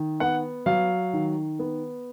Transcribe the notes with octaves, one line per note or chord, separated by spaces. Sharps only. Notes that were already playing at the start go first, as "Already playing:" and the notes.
Already playing: D#3
B3 F#5
F#3 F5
D#3
B3